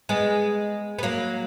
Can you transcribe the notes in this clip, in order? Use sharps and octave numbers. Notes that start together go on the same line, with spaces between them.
G#3 B3
B3
F#3 A#3